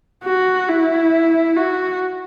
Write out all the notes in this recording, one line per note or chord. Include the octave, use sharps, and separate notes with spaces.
F#4
E4
F#4